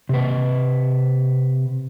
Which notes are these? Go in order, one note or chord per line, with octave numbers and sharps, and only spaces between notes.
C3 B4